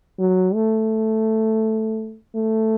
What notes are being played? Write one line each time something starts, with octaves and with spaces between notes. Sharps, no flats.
F#3
A3
A3